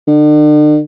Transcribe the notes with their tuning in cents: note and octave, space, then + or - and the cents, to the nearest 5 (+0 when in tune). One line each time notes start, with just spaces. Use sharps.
D3 +40